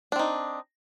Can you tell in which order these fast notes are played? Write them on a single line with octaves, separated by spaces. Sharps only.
D4 C4 D#4